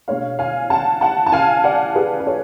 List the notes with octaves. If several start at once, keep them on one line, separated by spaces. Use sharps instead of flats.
B2 G#3 D4 C#5 F5
F5 G#5
F#5 A5
F#5 A5
A5
F5 G#5
D5 F#5
G#4 B4
B4
A4 C#5